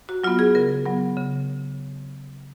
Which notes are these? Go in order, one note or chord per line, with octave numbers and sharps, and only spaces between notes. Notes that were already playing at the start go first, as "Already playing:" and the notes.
F#4
F#3 B3 F4
G#4
C#3 A#4
F#3 B3
C#3